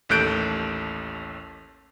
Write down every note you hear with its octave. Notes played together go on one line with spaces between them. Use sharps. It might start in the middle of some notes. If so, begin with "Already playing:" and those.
A1 D#2 A3 F#6 G6 D7